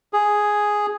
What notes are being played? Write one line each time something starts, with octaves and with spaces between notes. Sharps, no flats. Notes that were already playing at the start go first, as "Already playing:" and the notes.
G#4